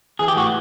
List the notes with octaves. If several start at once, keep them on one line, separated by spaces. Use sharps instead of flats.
E3 G#4
G4
A2 F#4